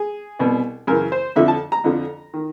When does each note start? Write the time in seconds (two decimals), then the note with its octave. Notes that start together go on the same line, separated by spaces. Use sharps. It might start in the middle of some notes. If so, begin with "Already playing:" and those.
Already playing: G#4
0.39 C2 B2
0.87 F#2 C#3 E3 A#4
1.12 C5
1.36 F2 D3 F3 E5
1.48 A5
1.72 A#5
1.84 F2 D3 F3
2.34 D#3